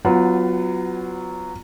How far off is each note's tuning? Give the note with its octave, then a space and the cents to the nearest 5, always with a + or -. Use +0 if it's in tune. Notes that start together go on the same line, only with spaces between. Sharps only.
F#3 +0 B3 +25 F4 +0